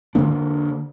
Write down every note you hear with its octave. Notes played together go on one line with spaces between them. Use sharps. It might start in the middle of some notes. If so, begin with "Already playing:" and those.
D3 F#3 A#3 D4